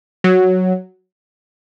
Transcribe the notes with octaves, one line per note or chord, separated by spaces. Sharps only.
F#3